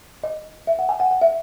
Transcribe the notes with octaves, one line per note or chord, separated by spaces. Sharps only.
D#5
E5
F#5
G#5
F#5
F#5
E5